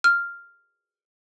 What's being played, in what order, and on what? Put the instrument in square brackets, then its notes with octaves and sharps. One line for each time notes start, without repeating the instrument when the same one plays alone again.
[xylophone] F6